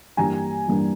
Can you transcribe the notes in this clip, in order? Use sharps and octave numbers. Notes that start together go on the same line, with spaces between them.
G2 E3 G3 A#3 G#5 A#5
G2 E3 G3 A#3